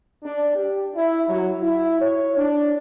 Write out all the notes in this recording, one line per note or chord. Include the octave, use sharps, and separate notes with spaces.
D4
G4
E4
F#3
E4
C#5
D4